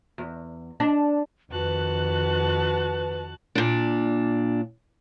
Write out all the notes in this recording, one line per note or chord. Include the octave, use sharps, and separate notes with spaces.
E2
D4
F2 D#3 F#4 B4 A5 F#6
A#2 D4